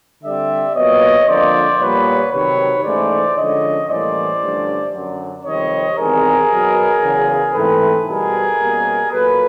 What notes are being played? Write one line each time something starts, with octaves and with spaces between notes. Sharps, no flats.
D3 G3 C4 D5 E5
A#2 F#3 B3 C#5 D#5
F2 D3 F3 A#3 C5 D5
A#2 G3 B3 B4 C#5
C3 D#3 F#3 B4 C#5
G#2 E3 A3 C#4 C5 D5
D3 F3 G#3 C#4 C#5 D#5
A2 E3 G3 A#3 C#4 C5 D5
G2 D3 F3 A3 C#4
F#2 D3 F#3
F2 C3 D#3 G3 C4 C#5 D#5
E2 C3 D#3 G#3 C4 G#4 A#4
B2 F#3 B3
E2 C#3 F#3
G#2 E3 A3 C4 A4 B4
B2 G3 B3 G#4 A#4
B2 G3 A#3 C#4
A#2 F#3 A#3 A4 B4